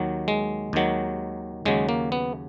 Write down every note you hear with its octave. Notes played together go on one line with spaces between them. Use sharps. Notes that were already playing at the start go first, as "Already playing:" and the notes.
Already playing: D#2 D#3 F#3
G#3
D#2 D#3 F#3
D#2 C#3 F#3 G#3
A#3
B3